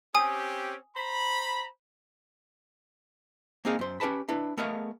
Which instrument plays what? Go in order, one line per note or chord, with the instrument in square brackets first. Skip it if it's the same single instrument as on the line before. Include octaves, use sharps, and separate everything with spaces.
[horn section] C4 C#4 G4 [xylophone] G#5 D#6
[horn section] C5 A#5 B5
[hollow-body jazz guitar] A#3 C4 D#4 G#4 F5
F#2 C5
C#4 G4 B4 A5 B5
D4 E4 B4
A3 B3 G#4 A#4 D#5 F5